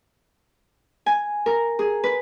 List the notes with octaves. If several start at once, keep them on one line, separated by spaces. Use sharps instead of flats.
G#5
A#4
G#4
B4